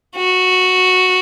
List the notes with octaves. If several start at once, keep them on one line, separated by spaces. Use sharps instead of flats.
F#4